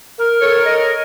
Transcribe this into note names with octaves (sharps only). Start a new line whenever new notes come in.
A#4
A4 C#5
C#5 D#5